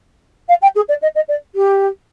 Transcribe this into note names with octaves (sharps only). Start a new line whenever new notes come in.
F5
G5
G#4
D5
D#5
D#5
D5
G4